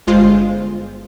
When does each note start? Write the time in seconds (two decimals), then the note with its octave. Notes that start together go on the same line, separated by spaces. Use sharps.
0.07 G1 G#3 F4 C5